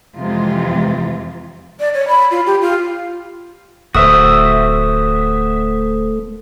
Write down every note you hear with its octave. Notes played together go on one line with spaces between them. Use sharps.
F2 C3 E3 G#3 F4
D5
C#5
B5
F4
G4
F4
D1 A3 F#4 C5 E5 D#6